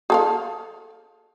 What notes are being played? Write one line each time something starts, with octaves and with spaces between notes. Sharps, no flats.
G#4 A4 F5